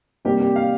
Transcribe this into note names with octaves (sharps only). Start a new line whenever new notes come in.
C3 G3 A#3 G4
G4
F5